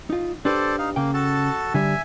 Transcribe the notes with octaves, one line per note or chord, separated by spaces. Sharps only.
D#4 F4
D4 G4 A4 B4 C5 D5
D#4 F5
C#3 A#3 G5
F#4 A4 A5
D3 G3 E5 G#5